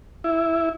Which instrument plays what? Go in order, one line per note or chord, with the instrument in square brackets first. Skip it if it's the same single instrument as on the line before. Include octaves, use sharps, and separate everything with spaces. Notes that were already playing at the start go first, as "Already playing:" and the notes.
[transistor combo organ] E4